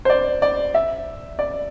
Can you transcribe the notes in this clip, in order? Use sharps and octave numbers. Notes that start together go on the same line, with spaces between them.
C5
D5
D5
E5
D5